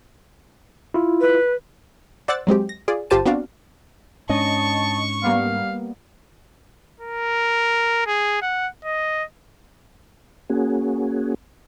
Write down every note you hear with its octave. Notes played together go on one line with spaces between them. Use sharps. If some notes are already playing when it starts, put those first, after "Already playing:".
E4 F4
B4
C5 D5 F#5 E6 F#6 A6
F#3 G#3 C4 G4
A#6
F4 G#4 D5
G1 F4 G4 C5 A5 D#7
B3 C4 D4 F#4 D5 F5
G#2 C#4 D4 D#5 A5 C#6
G3 A#3 B3 F5
A#4
G#4
F#5
D#5
A#3 C#4 F#4 G#4